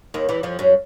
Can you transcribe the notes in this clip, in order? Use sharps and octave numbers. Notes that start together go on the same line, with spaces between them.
D#2 D#3
E2 E3
F2 F3
F#2 F#3